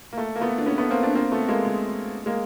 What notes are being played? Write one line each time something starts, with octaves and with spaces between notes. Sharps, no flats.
A#3
A3
A#3
A3 B3
D4
B3 C#4
A3 B3
A#3 C4
C4 D4
A#3 C4
A3 B3
G#3 A#3
G#3
G#3 A#3